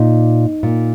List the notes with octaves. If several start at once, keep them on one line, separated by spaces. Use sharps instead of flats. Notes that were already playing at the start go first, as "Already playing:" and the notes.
Already playing: A#2 D#4
A#2